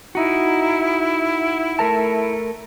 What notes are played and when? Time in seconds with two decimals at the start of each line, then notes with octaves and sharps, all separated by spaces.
0.15 D#4 E4 F#4
1.79 A3 A#4 A5